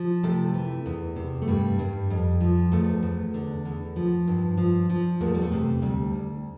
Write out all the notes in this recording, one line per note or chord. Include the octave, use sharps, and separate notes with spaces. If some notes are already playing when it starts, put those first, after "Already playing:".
Already playing: F3
C3 A3
E3
E2
C3
A3
G2 G3
G2
F2
F3
E2 A3
E2
D3
E2
F3
G2
F3
F3
E2 A#3
A3
G3
A3
C3
D2 G3
D2